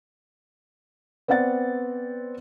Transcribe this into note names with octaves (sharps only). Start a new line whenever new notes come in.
B3 C4 D5 F#5 A6